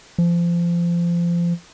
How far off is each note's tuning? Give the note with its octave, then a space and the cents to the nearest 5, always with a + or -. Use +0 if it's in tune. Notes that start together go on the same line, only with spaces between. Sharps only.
F3 -25